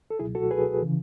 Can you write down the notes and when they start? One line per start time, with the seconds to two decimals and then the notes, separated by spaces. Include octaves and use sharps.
0.10 A4
0.19 C#2 B2 F#3 E4 G#4
0.35 F#4 A4
0.51 G#4 B4
0.82 C#3 E3